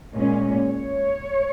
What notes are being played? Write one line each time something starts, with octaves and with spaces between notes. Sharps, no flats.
A#2 G#3 C#4
C#5